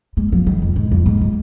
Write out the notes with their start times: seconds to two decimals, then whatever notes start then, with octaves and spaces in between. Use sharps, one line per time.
0.17 G#3
0.32 F3
0.47 D#3
0.62 F2
0.76 G#2
0.91 F2
1.06 G#2
1.21 G#3